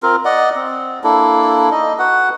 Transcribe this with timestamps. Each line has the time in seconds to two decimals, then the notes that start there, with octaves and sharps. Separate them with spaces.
0.03 C4 F4 A#4
0.25 D5 D#5 F#5
0.56 C4
1.04 A#3 D4 E4 A4
1.72 D#4 D#5
1.99 F#4 B4 F#5